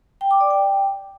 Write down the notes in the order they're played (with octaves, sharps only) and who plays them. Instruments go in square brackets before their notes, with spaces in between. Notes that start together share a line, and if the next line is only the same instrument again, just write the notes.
[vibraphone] G5
D6
D5
G5